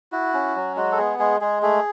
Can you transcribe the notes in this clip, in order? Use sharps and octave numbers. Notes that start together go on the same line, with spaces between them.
E4 F#4
C#4
F#3
G#3 F#4
A4
B3 G#4
G#3 G#4
G#3 G#4
A3 G#4